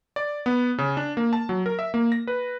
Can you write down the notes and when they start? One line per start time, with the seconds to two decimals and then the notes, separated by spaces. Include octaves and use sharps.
0.16 D5
0.46 B3
0.78 C#3
0.97 D4
1.17 A#3
1.33 A5
1.49 F#3
1.66 A#4
1.79 E5
1.94 A#3
2.12 A#6
2.27 B4